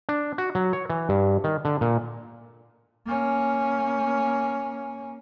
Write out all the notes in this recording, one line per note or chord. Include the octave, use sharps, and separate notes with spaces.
D4
F#4
F#3
C#5
E3
G2
D#3
D3
A#2
A#3 C#4